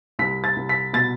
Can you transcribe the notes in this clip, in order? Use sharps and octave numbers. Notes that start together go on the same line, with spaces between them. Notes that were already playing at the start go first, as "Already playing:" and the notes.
C2 B6
A6
C2
B6
B2 A6